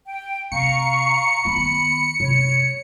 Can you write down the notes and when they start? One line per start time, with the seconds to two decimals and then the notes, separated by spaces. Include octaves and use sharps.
0.06 G5
0.52 C3 F5 A#5 C#6 C#7
1.45 D#3 B3 B5
2.20 C3 C#5